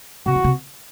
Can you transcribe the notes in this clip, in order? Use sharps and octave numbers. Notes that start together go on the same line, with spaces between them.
C3 F#4
E3
C3